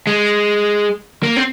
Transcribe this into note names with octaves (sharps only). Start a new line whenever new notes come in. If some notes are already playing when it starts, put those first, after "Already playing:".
G#3
A#3
C4